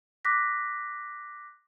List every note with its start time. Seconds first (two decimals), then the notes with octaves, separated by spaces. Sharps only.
0.25 D6 F#6 A#6 B6